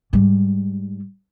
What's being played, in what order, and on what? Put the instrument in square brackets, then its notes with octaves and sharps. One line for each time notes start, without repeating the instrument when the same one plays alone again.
[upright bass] G#2 G3